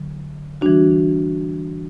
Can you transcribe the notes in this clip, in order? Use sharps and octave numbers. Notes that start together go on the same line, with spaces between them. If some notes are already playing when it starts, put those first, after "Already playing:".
Already playing: D3 F#3
E3 G3 D4 F#4